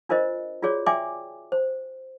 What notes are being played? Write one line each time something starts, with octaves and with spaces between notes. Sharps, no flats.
D4 F4 A#4 C5 D#5
F4 F#4 G#4 C#5 D5
D5 E5 G5 G#5 C6 D6
C5